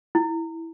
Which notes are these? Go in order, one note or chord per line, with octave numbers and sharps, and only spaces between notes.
E4